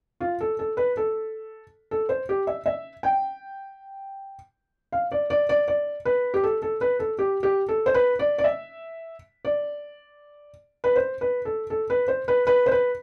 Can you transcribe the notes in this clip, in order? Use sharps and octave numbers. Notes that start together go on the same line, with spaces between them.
F4
A4
A4
B4
A4
A4
C5
G4
E5
E5
G5
F5
D5
D5
D5
D5
B4
G4
A4
A4
B4
A4
G4
G4
A4
C5
B4
D5
D5
E5
D5
B4
C5
B4
A4
A4
B4
C5
B4
B4
C5
B4